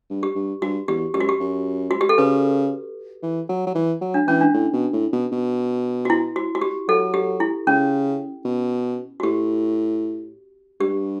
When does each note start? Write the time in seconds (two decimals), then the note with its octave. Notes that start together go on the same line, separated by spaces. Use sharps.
0.10 G2
0.23 G4
0.35 G2
0.62 G2 F#4
0.88 E2 G4
1.14 F#2 G4
1.20 F#4
1.29 G4
1.40 F#2
1.91 F#4
2.01 G4
2.09 A4
2.18 C#3 B4
3.23 E3
3.49 F#3
3.66 F#3
3.75 E3
4.01 F#3
4.14 D4
4.27 E3 C#4
4.41 D4
4.53 A2
4.73 B2
4.92 A2
5.13 B2
5.32 B2
6.05 F#4
6.10 E4
6.36 F#4
6.55 F#4
6.61 G4
6.88 F#3 A4
7.14 G4
7.40 E4
7.67 C#3 C#4
8.45 B2
9.20 F#4
9.23 A2 G4
10.80 G2 G4